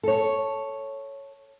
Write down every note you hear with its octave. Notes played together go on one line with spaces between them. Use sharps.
A4 C#5